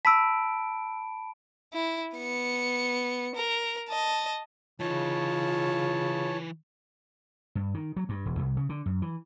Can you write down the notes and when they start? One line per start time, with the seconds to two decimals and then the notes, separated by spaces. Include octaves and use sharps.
0.05 A5 B5 E6 B6 D7
1.73 E4
2.17 B3 C#7
3.35 A#4
3.89 D#5 A5
4.80 C#3 E3 D#4 F4 C#5 A5
7.55 G2
7.74 D#3
7.96 F#3
8.09 G2
8.26 E1
8.39 C2
8.57 C#3
8.69 D3
8.86 F#2
9.02 E3